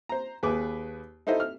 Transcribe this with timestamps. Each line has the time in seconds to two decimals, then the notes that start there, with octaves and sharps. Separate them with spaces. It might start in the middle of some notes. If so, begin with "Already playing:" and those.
0.09 C5 A#5
0.43 D#2 G#4 B4 D6
1.27 D#4 E4 A4 C5 D#5
1.40 F6